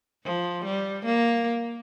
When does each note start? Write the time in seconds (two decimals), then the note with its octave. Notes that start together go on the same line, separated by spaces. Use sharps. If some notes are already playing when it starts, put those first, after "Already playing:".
0.24 F3
0.64 G3
1.05 A#3